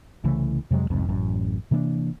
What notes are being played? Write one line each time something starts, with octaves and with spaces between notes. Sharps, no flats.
C2 C#3 E3 A3
F2 C3 F#3 G#3
F1 C2 F2 G#2
A1 F#2
C3 E3 A#3 D4